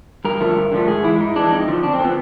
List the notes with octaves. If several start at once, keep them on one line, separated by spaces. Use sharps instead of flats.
G2 A#4
D3 F3 A3
G2
D3 F3 A3
G#2 G#4
E3 G#3 E4
G#2 D#4
E3 G#3 D4
F2 D#4
D3 F3
F2 D4
C4
D3 F3 B3